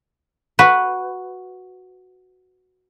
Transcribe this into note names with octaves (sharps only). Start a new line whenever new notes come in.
F#4 B4